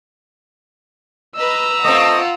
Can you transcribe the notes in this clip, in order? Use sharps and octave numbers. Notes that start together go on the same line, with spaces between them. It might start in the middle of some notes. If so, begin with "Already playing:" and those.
B4 D#5 A#5 E6
A3 C4 F4 D#5 F#5